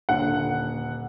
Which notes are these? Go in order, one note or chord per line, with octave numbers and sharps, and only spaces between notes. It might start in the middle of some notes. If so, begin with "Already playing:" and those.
D#1 D3 F#5